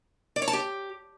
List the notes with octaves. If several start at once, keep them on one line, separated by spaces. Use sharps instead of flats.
D5
C#5
A5
G4